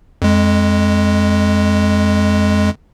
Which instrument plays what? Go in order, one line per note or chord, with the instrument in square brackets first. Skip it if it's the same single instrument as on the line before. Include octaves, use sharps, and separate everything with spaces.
[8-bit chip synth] F2 G#3